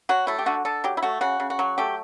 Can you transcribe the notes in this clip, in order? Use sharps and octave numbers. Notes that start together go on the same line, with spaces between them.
F#3 F#4
A3 E4
G4
D3 F#4
D3 A4
F#3 G4
E4
A3 F#4
C#3 F#4
C#3
F#4
F#3
A3 G4